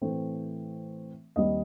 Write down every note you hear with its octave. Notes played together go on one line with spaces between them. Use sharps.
A2 E3 A3 C4
D#2 D#3 G3 C4 D#5